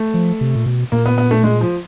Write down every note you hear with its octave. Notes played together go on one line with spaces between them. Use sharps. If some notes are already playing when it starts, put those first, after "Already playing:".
Already playing: A3
F3
C3
A#2
B2
A#2 A#3
B3
B3
A3
G#3
F3